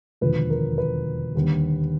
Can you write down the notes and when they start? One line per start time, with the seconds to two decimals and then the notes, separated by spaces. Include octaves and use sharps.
0.21 E1 D#2 D3 F3 B4
0.50 A#4
0.78 B4
1.35 D#2 D3 G3